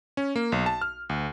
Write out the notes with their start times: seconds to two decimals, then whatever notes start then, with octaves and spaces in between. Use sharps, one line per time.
0.17 C#4
0.36 A#3
0.52 B1
0.66 A5
0.81 F6
1.09 D2